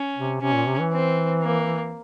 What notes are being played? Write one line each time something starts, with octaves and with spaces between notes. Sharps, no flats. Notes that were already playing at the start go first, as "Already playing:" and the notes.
Already playing: C#4
C3
C3 C#4
A#2
C3
E3
C4
A#3